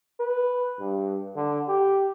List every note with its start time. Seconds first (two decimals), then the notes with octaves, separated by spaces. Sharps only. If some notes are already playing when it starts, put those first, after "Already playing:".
0.20 B4
0.80 G2
1.36 D3
1.68 G4